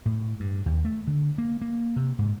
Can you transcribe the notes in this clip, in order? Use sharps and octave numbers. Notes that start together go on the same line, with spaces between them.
A2
G2
D#2
A3
D3
A#3
A#3
C3
G#2